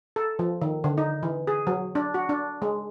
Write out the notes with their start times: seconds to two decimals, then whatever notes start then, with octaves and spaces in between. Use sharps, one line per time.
0.16 A4
0.39 F3
0.61 D#3
0.84 D3
0.98 D#4
1.23 E3
1.47 G#4
1.67 F#3
1.95 D4
2.14 F#4
2.29 D4
2.62 G#3